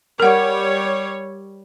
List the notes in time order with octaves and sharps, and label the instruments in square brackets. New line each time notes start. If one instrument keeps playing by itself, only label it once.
[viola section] G3 C#5 [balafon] A#4 F#5